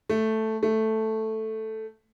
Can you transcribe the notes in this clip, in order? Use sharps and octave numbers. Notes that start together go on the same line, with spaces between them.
A3
A3